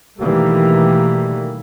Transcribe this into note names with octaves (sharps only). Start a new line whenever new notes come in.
B2 D#3 E3 G3 A3 A#3